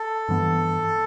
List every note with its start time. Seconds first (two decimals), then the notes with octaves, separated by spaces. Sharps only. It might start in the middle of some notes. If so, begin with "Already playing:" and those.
Already playing: A4
0.28 G2 E3 B3